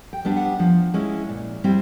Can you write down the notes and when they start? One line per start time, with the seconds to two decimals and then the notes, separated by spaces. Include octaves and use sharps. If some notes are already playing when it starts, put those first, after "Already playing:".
0.13 G5
0.25 G3 B3 D4
0.37 F#5
0.59 F3
0.94 G#3 C#4 E4
1.29 A#2
1.64 G3 C4 E4